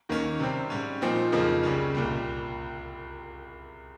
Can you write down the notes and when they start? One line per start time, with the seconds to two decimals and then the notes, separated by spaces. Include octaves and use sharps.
0.09 D#2 D#3 A#3 C#4
0.39 C3 G3 C4
0.70 G#2 G3 C#4
1.01 A#2 F3 C4 D#4
1.32 F2 C#3 F3 A#3 D#4
1.63 C#2 C#3 G3 C#4
1.95 C2 A#2 G3